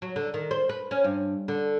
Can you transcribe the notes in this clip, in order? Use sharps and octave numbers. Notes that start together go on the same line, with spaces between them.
F#3
D3
D#3
C5
B4
C#4
G2
D3